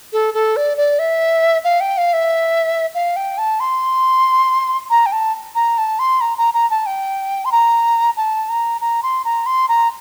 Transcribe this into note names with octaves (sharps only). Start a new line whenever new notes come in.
A4
A4
D5
D5
E5
F5
G5
F5
E5
F5
G5
A5
C6
A#5
G5
A5
A#5
A5
C6
A#5
A#5
A#5
A5
G5
C6
A#5
A5
A#5
A#5
C6
A#5
C6
A#5